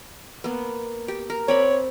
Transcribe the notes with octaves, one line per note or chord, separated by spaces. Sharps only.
A#3 B3
G4
A#4
C4 C#5 D5 B5